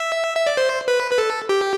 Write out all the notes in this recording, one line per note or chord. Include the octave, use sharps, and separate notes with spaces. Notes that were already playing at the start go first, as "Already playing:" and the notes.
Already playing: E5
E5
D5
C5
B4
B4
A4
G4